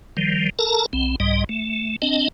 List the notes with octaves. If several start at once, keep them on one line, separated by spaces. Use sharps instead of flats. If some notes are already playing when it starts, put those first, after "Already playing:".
D#3 F3 G3
A4 A#4 A5 A#5
B1 C4
C2 G#2 G3 D#5
A3
C4 D4 D#5